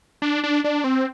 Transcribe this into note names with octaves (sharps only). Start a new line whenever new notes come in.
D4
D4
D4
C4